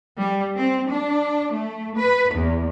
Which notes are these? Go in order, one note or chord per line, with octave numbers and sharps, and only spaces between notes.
G3
C4
D4
A3
B4
E2